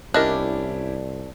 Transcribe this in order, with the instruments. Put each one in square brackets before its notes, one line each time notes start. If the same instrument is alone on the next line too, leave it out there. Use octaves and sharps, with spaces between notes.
[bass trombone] C2 [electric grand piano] C#4 E4 G4 [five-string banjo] D4 [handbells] A#4 D#5 F#6